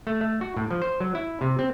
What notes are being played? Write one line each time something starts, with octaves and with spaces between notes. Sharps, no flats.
A3
A3
F#4
A2
F3
C5
F#3
E4
C3
C4